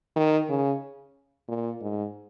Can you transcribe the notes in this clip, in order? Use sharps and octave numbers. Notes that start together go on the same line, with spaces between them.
D#3
C#3
A#2
G#2